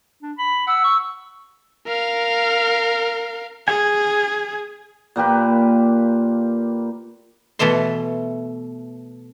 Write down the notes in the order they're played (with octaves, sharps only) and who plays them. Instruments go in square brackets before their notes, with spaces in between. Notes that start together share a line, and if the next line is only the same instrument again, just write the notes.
[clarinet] D4
B5
[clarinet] F#5 [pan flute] E6
[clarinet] C#6
[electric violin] A#4 F5
[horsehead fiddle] G#4 [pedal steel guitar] G#5
[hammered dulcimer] A#2 A#3 G4 B4
[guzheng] B2 E3 A3 E5 C6